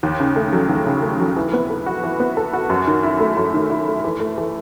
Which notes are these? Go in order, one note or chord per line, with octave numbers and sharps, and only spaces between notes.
D#2
C#3
A3
F#3
D#2
C#3
A3
F#3
E3
B3
A4
F#4
E3
B3
A4
F#4
F#2
D#3
E4
A3
F#2
D#3
E4
A3
E3
A3
E3